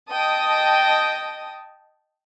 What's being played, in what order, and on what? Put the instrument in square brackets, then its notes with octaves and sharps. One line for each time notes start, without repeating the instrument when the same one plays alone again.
[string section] D#5 G5 A5 D#6